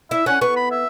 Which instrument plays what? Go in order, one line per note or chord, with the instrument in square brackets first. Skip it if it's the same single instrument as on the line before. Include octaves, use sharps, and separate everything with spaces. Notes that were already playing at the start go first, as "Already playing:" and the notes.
[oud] E4 [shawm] E5
[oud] C#4 [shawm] F#5
[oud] B3 [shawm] C#6
[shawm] B5
E5